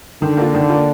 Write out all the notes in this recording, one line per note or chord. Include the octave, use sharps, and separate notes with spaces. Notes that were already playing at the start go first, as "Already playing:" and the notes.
D3 D#3
A#3 D4 F4
D#3
A#3 D4 F4